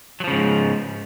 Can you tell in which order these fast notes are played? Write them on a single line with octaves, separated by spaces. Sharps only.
F#3 F3 C#3 G#2